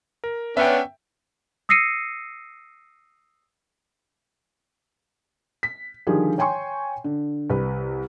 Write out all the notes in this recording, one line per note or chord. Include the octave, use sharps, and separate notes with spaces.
A#4
B3 C#4 D4 E5 G5
D#6 E6 A#6 C7 C#7 D#7
B6
D3 D#3 F3 G3 G4 G#4
C#5 G5 G#5 C6 C#6
D3
C2 B4